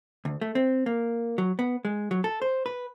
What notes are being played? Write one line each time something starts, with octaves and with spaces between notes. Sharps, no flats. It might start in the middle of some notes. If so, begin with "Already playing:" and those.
D2
A3
C4
A#3
F#3
B3
G#3
F#3
A4
C5
B4